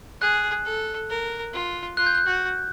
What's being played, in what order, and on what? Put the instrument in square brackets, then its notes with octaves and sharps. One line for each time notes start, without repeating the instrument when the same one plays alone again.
[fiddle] G#4 [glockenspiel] F#6
[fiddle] A4
A#4
F4
[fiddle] F4 [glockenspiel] F#6
[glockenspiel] G6
F#6
[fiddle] F#4